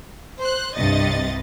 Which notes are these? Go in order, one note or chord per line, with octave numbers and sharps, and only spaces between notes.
C5 F#6
C2 G2 C3 D#5 A6